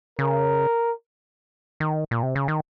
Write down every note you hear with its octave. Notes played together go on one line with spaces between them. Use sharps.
C#3 A#4
D#3
A#2
C3
C#3
D#3